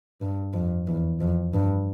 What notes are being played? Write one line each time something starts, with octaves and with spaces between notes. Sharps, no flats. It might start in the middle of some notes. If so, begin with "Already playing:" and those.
G2
F2
E2
F2
G2